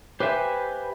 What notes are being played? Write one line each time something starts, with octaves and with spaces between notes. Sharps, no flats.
G4 B4 C5 E5 G#5